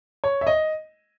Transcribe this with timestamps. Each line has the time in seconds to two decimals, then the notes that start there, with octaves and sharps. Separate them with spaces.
0.24 C#5
0.41 E5
0.47 D#5